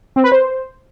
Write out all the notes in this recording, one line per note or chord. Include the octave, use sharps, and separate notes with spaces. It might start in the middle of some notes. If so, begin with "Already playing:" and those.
C4
B4
C5